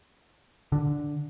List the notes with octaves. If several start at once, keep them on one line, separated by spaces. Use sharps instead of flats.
D3